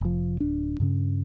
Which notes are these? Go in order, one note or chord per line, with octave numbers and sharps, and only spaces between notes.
F1 F3
D1 D4
G2 C#3 C#4